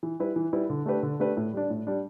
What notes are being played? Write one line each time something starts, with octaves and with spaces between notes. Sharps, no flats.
E3
G3 E4 B4
E3
G3 E4 B4
D3
A3 D4 G4 B4
D3
A3 D4 G4 B4
A2
G3 D4
A2
G3 D4